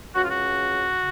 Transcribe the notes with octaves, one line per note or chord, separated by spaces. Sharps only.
C#2 C#3 F#4
F4
F#4
C#3